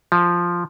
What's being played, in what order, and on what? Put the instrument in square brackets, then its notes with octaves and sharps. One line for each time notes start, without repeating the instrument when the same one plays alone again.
[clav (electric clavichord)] F3